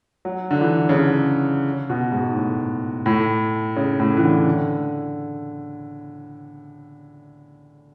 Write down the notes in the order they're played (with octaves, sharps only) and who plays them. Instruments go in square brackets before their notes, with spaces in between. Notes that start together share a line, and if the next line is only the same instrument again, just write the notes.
[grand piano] F#3
D3
E3
C#3
D3
B2
G#2
A2
A2
C#3
A2
E3
D3
D3